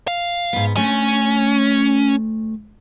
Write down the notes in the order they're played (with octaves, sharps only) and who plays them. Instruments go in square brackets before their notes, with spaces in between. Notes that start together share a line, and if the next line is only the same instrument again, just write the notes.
[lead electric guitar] F5
[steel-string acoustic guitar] G#2 B3
[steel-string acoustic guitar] D2 A3 [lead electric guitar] C#4